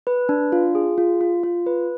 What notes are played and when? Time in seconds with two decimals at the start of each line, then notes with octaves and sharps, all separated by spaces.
0.07 B4
0.29 D4
0.52 F4
0.75 G#4
0.98 F4
1.21 F4
1.43 F4
1.66 B4